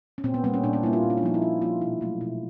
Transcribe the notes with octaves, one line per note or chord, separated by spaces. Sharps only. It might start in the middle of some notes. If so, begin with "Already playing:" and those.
C#4
A#2 C4
B3
G3 A#3 C4
C#4
A#2 D4
C#4
G3 A#3 E4
F4
A#2
C#4
D4
F3 A#3 D#4
E4
A#2 F4
F3 A#3 F4
B2 E4
F#3 A3
B2 E4